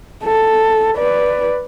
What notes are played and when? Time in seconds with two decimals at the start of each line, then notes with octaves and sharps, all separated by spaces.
0.24 A4
0.97 B4 D5